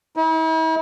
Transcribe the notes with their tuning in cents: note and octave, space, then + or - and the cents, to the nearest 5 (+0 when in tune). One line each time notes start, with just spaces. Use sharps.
E4 -45